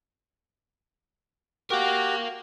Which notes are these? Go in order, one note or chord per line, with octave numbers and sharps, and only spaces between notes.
F#4 G4 A#4 F5